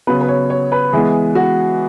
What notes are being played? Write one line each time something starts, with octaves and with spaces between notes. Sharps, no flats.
C#3 F#3 B3 B4
B4
C#5
C#5
B4
E3 G#3 B3 G#4
F#4